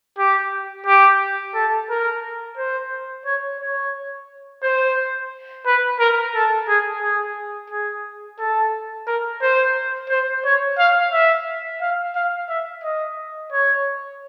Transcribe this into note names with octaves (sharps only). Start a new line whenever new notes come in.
G4
G4
A4
A#4
C5
C#5
C#5
C5
B4
A#4
A4
G#4
G#4
G#4
A4
A#4
C5
C5
C#5
F5
E5
F5
F5
E5
D#5
C#5